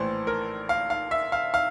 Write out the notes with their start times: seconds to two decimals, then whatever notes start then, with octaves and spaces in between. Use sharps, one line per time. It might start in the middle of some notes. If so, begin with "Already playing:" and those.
Already playing: A#1 A2 E3 C5
0.27 A#4
0.69 F5
0.90 F5
1.11 E5
1.32 F5
1.54 F5